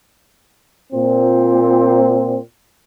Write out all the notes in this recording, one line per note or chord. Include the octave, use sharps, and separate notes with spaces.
A#2 C4